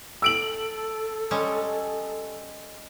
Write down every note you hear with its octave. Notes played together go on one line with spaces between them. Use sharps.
A4 E6 D7 F#7
G3 G#3 C#4